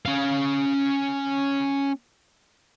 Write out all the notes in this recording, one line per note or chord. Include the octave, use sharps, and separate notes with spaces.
C#4 F5